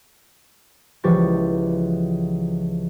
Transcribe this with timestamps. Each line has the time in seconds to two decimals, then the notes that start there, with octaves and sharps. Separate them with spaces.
1.04 C#2 E3 F3 G4 C#6 A6